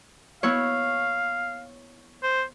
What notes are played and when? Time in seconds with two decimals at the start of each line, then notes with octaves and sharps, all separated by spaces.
0.43 B3 E4 C#5 F5
2.23 C5